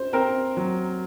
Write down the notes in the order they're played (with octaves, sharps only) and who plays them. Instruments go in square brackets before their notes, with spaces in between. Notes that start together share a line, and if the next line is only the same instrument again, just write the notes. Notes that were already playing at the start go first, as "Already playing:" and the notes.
Already playing: [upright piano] C5
[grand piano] C4 [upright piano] A#4
[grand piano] F#3